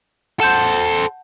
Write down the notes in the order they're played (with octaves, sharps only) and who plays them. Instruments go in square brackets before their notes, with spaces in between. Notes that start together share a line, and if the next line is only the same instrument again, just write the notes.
[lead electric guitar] A4 C5 [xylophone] F#5 A5 G6